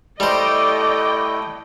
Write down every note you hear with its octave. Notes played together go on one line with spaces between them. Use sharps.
G3 A3 E4 A4 C5 D5 D#5 G5